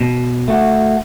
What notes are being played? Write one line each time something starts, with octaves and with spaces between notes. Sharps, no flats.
B2
A3 F#4